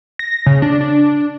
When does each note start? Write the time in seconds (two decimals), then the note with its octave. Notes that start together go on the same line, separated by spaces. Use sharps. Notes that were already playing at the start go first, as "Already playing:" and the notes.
0.19 A#6
0.46 C#3
0.62 D4
0.81 D4